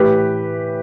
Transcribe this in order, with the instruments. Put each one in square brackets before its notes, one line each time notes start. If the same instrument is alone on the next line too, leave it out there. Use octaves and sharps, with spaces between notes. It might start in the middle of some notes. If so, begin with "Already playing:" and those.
Already playing: [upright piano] A2 E3 G4 B4